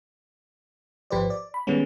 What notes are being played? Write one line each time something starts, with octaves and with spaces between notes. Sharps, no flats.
G#1 F3 G4 B4 C5 D5
D5
B5
D#3 G3 G#3 B3 C#4